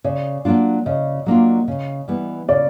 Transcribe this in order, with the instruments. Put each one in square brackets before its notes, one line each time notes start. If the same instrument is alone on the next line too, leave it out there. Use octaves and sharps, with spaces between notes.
[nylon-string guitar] C#3 [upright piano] D5
[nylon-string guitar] F#3 A#3 D4 F4
[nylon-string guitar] C#3 [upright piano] D#5
[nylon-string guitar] F#3 A#3 D4 F4
C#3
E3 G3 B3
[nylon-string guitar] C#3 [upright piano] D5